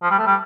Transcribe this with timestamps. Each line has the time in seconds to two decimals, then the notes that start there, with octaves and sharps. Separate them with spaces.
0.02 F3
0.10 G3
0.18 A3
0.26 G3